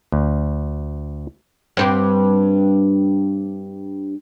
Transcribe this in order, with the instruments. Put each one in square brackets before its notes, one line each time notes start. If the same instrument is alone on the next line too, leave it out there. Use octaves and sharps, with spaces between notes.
[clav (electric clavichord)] D2
[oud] G2 C4 G4